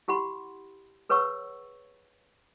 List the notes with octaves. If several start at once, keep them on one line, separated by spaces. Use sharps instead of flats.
E4 G4 F#5 B5 C6
G#4 B4 C#5 F#5 C#6 E6